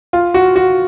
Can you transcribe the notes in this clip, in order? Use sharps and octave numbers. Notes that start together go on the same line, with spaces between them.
F4
F#4
F#4